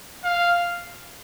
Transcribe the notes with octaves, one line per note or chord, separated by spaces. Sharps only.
F5